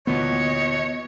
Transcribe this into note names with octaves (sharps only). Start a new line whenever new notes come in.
D2 A#2 E3 B3 C#5 D#5